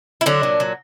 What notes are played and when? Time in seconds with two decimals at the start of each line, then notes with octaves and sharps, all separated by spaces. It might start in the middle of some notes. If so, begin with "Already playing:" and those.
0.21 E4
0.26 D3 F#3 D4
0.43 A#2
0.60 F#3